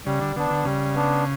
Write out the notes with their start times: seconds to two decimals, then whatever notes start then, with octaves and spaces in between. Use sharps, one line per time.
0.06 C#3 G3
0.21 D3
0.36 D3 B3 D4
0.51 D3
0.65 C#3 G3
0.95 B3 D4